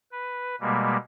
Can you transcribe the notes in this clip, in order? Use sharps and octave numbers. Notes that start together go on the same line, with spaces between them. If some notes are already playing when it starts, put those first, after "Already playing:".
B4
B2 G3 G#3 A#3